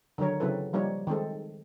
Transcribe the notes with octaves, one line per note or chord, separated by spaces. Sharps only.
D3 D#3 F#3 A#4 C#5
C#3 F#3 C4 E4 A4 B4
F3 G3 A#3 D#4 C#5
D#3 G#3 C4 A4